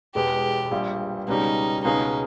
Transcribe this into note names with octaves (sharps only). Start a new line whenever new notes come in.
E1 E2 B2 G#3 G4
A#1 A#2 G3
C#2 B2 G3 C#4 D#4 G4
C#2 B2 G#3 C#4 D#4 G#4